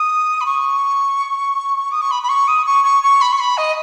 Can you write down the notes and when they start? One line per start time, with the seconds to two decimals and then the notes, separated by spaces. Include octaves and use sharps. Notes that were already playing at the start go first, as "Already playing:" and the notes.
Already playing: D#6
0.41 B5
0.46 C#6
1.92 D#6
2.01 C#6
2.11 B5
2.23 B5
2.29 C#6
2.48 D#6
2.66 C#6
2.84 C#6
3.03 C#6
3.21 B5
3.32 C#6
3.39 B5
3.57 D#5